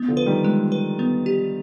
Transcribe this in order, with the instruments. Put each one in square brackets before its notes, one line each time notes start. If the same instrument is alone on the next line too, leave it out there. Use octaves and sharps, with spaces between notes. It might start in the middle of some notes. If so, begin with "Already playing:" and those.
Already playing: [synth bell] B3
[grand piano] D3 F3
[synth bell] B4
[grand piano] D#3 G3
[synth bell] G#3
B4
B3
G4